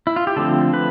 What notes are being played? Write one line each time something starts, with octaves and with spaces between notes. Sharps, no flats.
E4
F4
G4
D3 F3 A3 C4 A4
B4